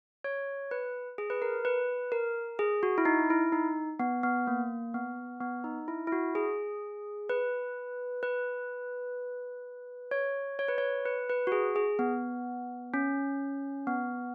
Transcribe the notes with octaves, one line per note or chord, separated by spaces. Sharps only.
C#5
B4
G#4
B4
A#4
B4
A#4
G#4
F#4
E4
D#4
E4
D#4
B3
B3
A#3
B3
B3
D#4
E4
E4
F#4
G#4
B4
B4
C#5
C#5
B4
C#5
B4
B4
F#4
G#4
G#4
B3
C#4
B3